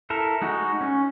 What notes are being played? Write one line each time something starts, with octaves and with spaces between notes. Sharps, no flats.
E4 A4 A#4
G#3 D#4 F#4
C#4